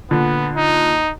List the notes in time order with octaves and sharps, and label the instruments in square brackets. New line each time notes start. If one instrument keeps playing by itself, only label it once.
[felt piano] A#2 D3 [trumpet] B3
[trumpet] D#4